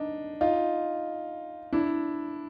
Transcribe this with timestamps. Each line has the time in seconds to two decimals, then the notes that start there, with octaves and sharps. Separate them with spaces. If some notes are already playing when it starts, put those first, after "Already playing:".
Already playing: D4 D#4
0.41 D#4 F4
1.73 D4 E4